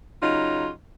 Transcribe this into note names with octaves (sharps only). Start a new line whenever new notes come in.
C#3 F#3 D#4 F4